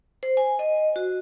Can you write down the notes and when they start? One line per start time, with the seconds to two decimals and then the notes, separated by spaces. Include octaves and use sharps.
0.23 C5
0.37 G#5
0.59 D#5
0.96 F#4